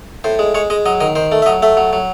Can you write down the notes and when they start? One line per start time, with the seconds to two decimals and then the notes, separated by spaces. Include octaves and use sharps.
0.24 A2 C5
0.39 G#3
0.55 G#3 C#5
0.70 G#3 D#5
0.86 F#3 D#5
1.00 D#3 D#5
1.15 D#3 C5
1.32 A3
1.42 E5
1.46 F#3 D#5
1.62 A3 E5
1.77 F#3
1.93 F#3